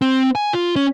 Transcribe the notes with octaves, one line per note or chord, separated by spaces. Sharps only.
C4
G#5
F4
C#4